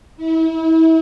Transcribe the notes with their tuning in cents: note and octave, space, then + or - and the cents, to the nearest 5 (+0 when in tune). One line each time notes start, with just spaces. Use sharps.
E4 -35